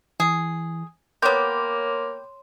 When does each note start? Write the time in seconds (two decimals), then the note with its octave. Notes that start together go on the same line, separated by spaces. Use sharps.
0.20 E3 G#4
1.22 A#3 B3 G4 C#5 C6 G6